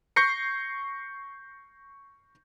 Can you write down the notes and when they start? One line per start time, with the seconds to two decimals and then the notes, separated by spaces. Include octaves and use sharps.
0.16 C#6 G6 A#6 C7 C#7